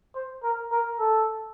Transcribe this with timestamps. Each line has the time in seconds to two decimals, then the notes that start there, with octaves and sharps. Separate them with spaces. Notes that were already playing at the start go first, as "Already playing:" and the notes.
0.15 C5
0.43 A#4
0.72 A#4
0.99 A4